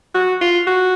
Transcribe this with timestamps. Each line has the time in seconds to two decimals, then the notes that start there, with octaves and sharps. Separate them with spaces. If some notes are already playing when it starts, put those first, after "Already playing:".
0.14 F#4
0.41 F4
0.67 F#4